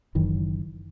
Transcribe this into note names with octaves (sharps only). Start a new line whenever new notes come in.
F#1 F#2 D#3 E3